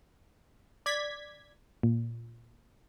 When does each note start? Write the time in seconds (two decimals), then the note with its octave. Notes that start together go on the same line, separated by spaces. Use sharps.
0.86 D5 G#6 B6
1.83 A#2